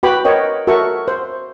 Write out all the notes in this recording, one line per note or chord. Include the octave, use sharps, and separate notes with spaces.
F#4 B4 G5 B5 D6
A#4 C#5 D#5 G5
F#4 A4 A#4 E5 C#6
C5